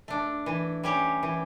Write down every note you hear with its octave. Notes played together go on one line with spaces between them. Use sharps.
A3 D4
E3
G3 C#4 G4
E3